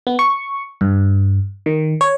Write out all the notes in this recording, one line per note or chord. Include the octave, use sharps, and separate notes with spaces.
B3
C#6
G2
D#3
C#5